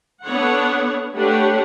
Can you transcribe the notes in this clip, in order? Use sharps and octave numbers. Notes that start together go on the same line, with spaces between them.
B3 D4 A4 C#5 F#5
A3 D4 G4 B4 C#5 F#5